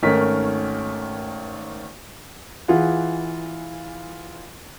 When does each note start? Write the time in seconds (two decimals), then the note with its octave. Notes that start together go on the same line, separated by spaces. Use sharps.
0.02 G#1 D#3 A3 C#4 A#4 B6
2.68 E3 F4 G#4 F#5